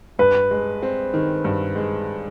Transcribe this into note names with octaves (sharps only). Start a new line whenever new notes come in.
G2 B4
G#3
C4
D#3
G2
G#3